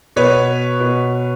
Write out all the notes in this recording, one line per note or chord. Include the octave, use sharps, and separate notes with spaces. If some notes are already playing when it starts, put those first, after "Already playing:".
B2 B4 C#5
B2